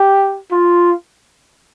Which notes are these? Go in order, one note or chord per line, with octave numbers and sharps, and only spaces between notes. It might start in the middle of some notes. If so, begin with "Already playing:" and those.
Already playing: G4
F4